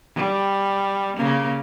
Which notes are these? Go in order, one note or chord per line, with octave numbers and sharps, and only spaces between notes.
G3
C#3 A#3